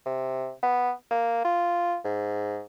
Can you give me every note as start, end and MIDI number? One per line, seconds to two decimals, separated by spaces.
0.06 0.53 48
0.63 0.92 59
1.11 1.41 58
1.45 1.98 65
2.04 2.62 44